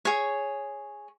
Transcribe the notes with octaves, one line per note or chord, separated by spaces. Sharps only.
G#4 C#5